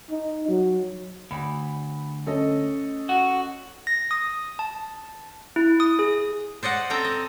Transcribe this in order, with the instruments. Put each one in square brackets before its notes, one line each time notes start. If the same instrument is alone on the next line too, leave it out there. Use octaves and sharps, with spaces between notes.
[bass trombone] D#4
F#3
[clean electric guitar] D2 [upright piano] B5
[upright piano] C#4 A4 D#5
[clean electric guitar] F#4
[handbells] A#6
D#6
A5
E4
D#6
G#4
[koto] C5 D5 D#5 F#5
C4 A4 G5 A#5
D#5